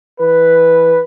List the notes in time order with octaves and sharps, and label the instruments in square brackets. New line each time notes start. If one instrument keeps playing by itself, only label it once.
[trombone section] E3 B4